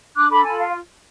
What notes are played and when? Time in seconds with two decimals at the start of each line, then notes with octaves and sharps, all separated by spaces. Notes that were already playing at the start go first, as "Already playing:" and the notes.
0.15 D4 D6 F#6
0.30 A4 B5 D6
0.44 F4 G#5 B5
0.59 F5